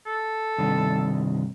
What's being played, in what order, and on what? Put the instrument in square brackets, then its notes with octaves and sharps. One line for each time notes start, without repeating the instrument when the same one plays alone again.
[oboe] A4
[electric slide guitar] G2 C3 D#3